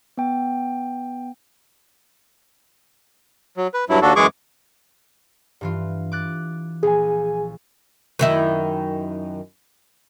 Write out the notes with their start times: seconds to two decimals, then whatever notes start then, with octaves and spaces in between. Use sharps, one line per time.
0.17 B3 G5
3.57 F#3
3.74 B4
3.89 G2 F#3 E4
4.02 D#2 D4 F#4 A4
4.16 F#2 E3 G#3 G#4 C#6 D6
5.61 G2 E3 F4
6.12 D6 F#6 A6
6.83 A#1 G#4 G#5
8.19 F#2 D#3 E4